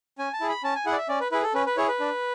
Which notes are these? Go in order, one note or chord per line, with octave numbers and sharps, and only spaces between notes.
C#4 G#5
A5
E4 G#4
B5
C#4 A5
G#5
E4 G#4 F#5
D5
E5
C#4 D5
B4
E4 G#4 B4
A4
C#4 B4
B4
E4 G#4 C#5
B4
D4